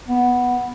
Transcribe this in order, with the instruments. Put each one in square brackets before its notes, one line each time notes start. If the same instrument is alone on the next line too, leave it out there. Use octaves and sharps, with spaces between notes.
[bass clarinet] B3